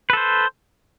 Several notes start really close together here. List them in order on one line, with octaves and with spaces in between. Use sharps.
B4 A4 C5